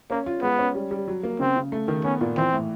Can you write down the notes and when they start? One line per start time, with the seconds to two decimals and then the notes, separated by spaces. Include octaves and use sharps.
0.10 A#3 C#4
0.26 F4
0.42 G#3 B3
0.59 C#4
0.75 G3
0.91 G3
1.08 F#3
1.23 A#3
1.40 C#3 C4
1.56 C#3
1.72 A3
1.88 D#3
2.04 B3 C#4
2.21 A#2
2.37 E3 C4
2.53 A2